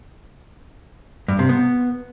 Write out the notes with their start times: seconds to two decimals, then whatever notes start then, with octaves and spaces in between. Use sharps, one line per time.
1.28 G2
1.39 C3
1.49 B3